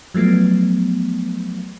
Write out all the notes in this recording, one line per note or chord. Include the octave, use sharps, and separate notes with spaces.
F3 F#3 A3 B3